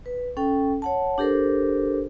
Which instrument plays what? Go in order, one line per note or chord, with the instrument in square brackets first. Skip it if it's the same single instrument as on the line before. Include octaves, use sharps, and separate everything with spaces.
[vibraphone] B4
C#4 A4 G5
C#5 F#5 A5
D4 G4 A4 A#4 C5